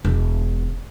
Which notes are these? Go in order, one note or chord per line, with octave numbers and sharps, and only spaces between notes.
E1